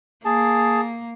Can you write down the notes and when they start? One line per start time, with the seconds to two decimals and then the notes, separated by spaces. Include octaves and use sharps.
0.25 A#3 G#4 A5